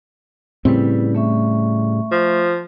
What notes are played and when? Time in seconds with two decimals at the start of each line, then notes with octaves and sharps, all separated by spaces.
0.65 A2 C#3 G3 C4 E4 B4
1.15 A3 E5 C#6
2.12 F3